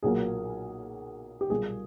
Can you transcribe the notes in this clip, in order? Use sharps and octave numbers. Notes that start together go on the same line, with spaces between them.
B1 A#2 F#3 A#3 G#4
G4
B1 A#2 G3 A#3 G#4